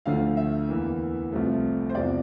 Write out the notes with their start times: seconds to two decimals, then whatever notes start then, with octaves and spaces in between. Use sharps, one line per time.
0.06 D2 D3 F3 A3 F5
0.37 E5
0.69 E2 E3 A#3
1.32 C2 C3 F3 A3
1.89 C5
1.95 E2 C3 F3 D5